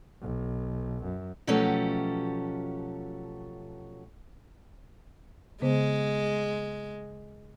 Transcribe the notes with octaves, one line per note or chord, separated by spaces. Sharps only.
B1
F#2
B2 F3 F#3 A3 C#4 G4
C#3 G#3 B3 C5